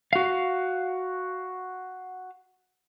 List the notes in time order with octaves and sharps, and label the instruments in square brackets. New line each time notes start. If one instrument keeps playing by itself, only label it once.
[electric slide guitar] F#4 F5